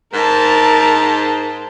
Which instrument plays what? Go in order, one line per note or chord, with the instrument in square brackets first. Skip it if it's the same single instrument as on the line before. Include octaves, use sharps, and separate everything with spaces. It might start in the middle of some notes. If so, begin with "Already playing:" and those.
[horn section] G#2 [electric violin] A#4 A5